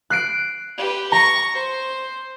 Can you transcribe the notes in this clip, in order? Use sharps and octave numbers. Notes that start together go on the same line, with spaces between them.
F#6 C7 D7
G4 B4
A#5 C#6
C5